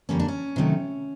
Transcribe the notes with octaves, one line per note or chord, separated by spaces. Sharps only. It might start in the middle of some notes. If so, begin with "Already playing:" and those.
F2 D3 G3 A#3 C#4
D4
C#4
C3 D#3 F#3 A3